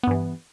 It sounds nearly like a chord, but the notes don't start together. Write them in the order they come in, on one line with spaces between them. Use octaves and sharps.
B3 G2 E3